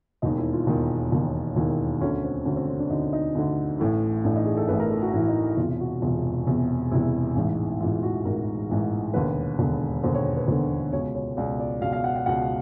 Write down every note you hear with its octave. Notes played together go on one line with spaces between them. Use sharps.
E1 D#2 D#3 D#4
E4
F4
E1 D#2 D#3
E1 D#2 D#3
E1 D#2 D#3 E4
D2 D3 C#4
C4
D2 D3 C#4
C4
C#4
D4
D2 D3 D#4
D#4
D2 D3
A1 A2 E3
A1 A2 E3 D4
D#4
G#4
A4
A1 A2 E3 B4
A#4
A4
F#4
A1 A2 E3 E4
D#4
E1 E2 C3 F4
F#4
E1 E2 C3 F4
E1 E2 C3
E1 E2 C3 E4
A1 G#2 E3
A1 G#2 E3 F4
F#4
A1 G#2 E3 A#4
A1 G#2 E3
E1 D#2 D3 B4
E1 D#2 D3
E1 D#2 D3 C5
C#5
B4
E1 D#2 D3 C5
C#2 B2 C#5
C#5
C#2 B2 D5
D5
C#2 B2 F5
F5
F#5
F#5
C#2 B2 F#5